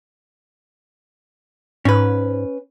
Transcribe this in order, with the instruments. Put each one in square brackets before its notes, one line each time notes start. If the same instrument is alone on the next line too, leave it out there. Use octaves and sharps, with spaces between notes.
[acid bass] G#2 [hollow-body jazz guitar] C#4 B4